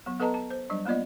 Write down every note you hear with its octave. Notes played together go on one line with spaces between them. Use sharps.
F#3 B3
B3 A4 B4 D#5 A5 A#5
A5
C5
F#3 G3 D4 D#5
A#3 B3 F4 D5 D#5